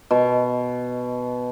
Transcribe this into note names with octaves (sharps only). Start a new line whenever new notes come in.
B2